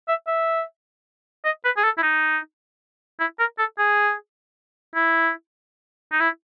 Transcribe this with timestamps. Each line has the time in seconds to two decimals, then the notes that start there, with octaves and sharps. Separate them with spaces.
0.08 E5
0.27 E5
1.45 D#5
1.65 B4
1.77 G#4
1.84 A4
1.97 E4
2.03 D#4
3.20 E4
3.39 A#4
3.59 A4
3.78 G#4
4.95 E4
6.12 D#4
6.20 E4